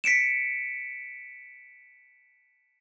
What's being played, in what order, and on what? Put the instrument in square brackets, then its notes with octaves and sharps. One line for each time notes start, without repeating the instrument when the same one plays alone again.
[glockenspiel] B6 C#7 D7 E7